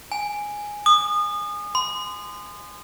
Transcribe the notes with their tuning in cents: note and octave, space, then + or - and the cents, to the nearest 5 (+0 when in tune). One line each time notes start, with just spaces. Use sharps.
G#5 -5
D#6 -30
C6 -25